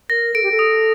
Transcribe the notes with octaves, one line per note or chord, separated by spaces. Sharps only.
A#4 A#6
A4 D7
G4
A4
D#6